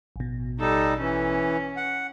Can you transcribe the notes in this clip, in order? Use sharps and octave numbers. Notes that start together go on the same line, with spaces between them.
A1 B2
G3 D#4 A4
E3 C#4
F#5